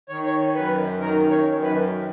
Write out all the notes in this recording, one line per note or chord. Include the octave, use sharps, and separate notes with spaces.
D#3 C#5
C#5
F#2 B4
D#3 A#4
C#5
F#2
B4
D#3